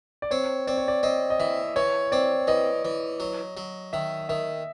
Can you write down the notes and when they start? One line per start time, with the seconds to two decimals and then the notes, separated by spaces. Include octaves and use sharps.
0.22 D5
0.31 C4 C#5
0.67 C4 D5
0.77 C#5
0.88 D5
1.03 C4 D#5
1.30 D#5
1.40 E3 E5
1.76 E3 C#5
2.12 C4 D5
2.47 E3 D#5
2.85 E3
3.20 F#3
3.57 F#3
3.93 D#3 E5
4.29 D#3 E5